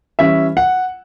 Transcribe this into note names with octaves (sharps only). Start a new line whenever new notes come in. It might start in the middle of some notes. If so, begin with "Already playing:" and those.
E3 G3 C#4 E5
F#5